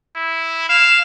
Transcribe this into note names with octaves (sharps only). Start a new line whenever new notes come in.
E4
F5 E7